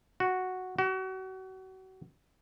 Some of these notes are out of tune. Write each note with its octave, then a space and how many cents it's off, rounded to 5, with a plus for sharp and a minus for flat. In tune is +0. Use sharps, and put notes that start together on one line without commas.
F#4 +0
F#4 +35